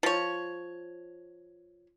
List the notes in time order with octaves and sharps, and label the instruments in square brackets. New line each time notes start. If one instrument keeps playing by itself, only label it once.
[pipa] F3 C#5